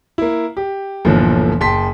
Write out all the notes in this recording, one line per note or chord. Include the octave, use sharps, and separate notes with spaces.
A#3 E4
G4
G1 D#2 A#2 D3 E3 F3
F#1 G5 A5 C6 B6